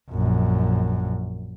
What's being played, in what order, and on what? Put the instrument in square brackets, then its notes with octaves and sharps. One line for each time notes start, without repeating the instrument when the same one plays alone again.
[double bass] A#1 F#2